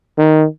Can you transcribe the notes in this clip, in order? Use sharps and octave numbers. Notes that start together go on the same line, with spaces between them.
D#3